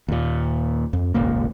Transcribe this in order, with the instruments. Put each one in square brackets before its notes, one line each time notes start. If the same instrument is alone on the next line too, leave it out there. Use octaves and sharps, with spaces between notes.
[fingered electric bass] D#2 A#2
F2
D#1 G#1 C#2 A#3